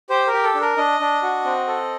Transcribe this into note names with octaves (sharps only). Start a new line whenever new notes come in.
G4 C5
A#4
G4
A4
D4
A#4
D4 D#5
D4
F#4
C4
A4